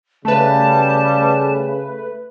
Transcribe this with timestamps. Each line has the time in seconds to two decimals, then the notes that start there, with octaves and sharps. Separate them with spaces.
0.25 C#3 G3 A3 B4 A5